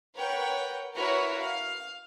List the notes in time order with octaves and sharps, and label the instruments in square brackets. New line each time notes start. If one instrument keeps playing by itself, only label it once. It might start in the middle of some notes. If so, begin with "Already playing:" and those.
[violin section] A#4 B4 C#5 F#5 G5
E4 F#4 A#4 B4 C#5
F5